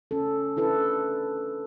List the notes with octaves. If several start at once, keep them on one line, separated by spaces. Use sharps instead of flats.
C#4 A4
D4 E4 A4 B4